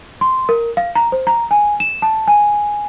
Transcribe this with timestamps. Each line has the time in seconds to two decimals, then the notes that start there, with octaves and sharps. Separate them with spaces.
0.21 C6
0.49 A#4
0.77 F5
0.95 A#5
1.12 C5
1.27 A#5
1.51 G#5
1.80 E7
2.02 A5
2.27 G#5